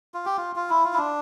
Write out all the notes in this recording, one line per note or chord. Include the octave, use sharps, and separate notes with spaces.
F4
G4
F4
F4
E4
F4
E4
D4